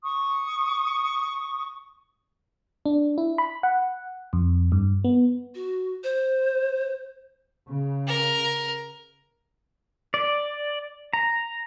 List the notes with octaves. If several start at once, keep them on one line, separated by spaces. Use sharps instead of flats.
C#6 D#6
D4
E4
B5
F#5
F2
G2
B3
F#4
C5
C#3
A#4
D5
A#5